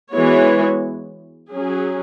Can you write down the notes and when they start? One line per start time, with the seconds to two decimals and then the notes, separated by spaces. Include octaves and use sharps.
0.13 E3 G#3 B3 F#4 C#5
1.51 F#3 C#4 G#4